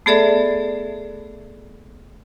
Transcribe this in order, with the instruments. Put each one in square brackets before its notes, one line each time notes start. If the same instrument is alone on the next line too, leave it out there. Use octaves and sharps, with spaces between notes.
[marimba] A3 B3 G#4 A4 D5 E5